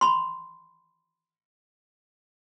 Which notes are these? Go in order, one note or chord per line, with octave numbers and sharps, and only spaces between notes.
B5 C6